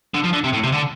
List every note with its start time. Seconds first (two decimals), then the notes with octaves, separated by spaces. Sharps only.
0.14 D3
0.24 F3
0.33 D3
0.44 C3
0.53 A2
0.64 C3
0.73 D3